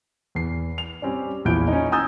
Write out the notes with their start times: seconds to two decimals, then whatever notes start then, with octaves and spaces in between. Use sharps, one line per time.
0.35 E2 C7
0.78 F7
1.02 G3 C4 C#4 D5
1.45 A#1 E2 F3 E4 G6 D7
1.68 C#4 D#4
1.92 G#5 A#5 D#6 E6 G6 A6